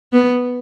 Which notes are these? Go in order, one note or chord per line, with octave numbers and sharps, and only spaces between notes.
B3